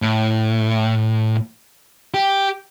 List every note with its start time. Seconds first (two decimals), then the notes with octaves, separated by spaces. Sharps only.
0.02 A2
2.14 G4